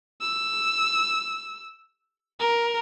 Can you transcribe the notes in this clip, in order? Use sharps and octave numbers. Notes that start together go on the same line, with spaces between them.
E6
A#4